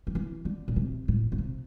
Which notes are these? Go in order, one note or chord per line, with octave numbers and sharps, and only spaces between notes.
F3
E3
D3
A#2
C3
A2
A#2
C3